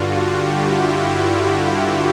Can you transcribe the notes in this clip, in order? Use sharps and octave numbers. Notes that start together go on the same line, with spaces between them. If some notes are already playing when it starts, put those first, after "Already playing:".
Already playing: G2 D3 F4 F#4
G4
E4